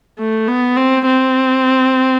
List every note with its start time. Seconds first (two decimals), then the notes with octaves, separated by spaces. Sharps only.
0.19 A3
0.48 B3
0.77 C4
1.06 C4